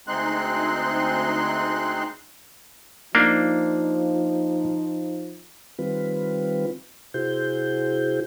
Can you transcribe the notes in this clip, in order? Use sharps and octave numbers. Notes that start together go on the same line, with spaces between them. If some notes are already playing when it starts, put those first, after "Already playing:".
D2 G#3 C4 D#4 C6 F#6
F3 A#3 D4 D#4
D#3 G3 C4 F4 B4
C3 E4 F#4 G#4 C5 G6